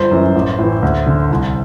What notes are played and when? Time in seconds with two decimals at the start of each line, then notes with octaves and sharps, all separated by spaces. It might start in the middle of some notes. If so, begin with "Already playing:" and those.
Already playing: G1 C5
0.11 F#2 E3
0.35 A1
0.58 A2 E3
0.82 D2
1.06 D3
1.31 C2